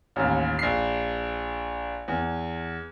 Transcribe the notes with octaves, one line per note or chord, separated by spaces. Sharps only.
A1 D#2
A#1 C7
E2